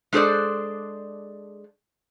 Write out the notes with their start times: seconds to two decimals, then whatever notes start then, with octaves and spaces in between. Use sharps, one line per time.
0.13 G#3 D4 G#4 A4 C5 D5